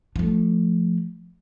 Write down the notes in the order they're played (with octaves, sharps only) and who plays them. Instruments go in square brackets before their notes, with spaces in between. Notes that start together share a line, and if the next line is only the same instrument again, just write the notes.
[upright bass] F3 A3